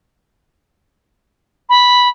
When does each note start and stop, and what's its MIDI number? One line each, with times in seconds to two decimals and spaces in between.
1.69 2.08 83